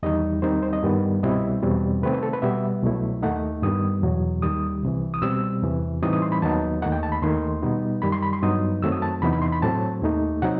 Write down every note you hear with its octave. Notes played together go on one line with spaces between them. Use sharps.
E2 D#3 G3 D#4 D#5
D#2 D#3 G3 C4 D#4 C5
C5
D#5
G2 D#3 G3 B3
C2 B2 G3 C4 E4 D#5
E2 B2 G3 C4
C3 D#3 A3 C4 B4
B4
A4
B4
B2 G3 B3 E5
C2 B2 F#3 A3 E4
D#2 D#3 A3 D#4 F#5
G2 D#3 G3 B3 D#6
E2 B2 F#3
D#2 D#3 G3 D#6
C2 C3 E3
D#6
B2 G3 C4 E6
E2 C3 E3
A2 E3 G3 C4 D#4 D#6
D#6
C6
B5
D#2 D#3 F#3 B3 D#4 A5
D#2 D#3 A3 D#4 F#5
G5
A5
B5
D#2 D#3 A3 D#4 C6
B2 G3 B3 D#4
F#2 D#3 G3 B5
C6
B5
C6
G2 F#3 B3 D#4 D#6
F#2 D#3 F#3 A3 C4 E6
D#6
A5
E2 C3 E3 B3 D#4 B5
B5
C6
B5
A2 F#3 A3 C4 A5
D#2 D#3 A3 D#4
C3 F#3 C4 D#4 F#5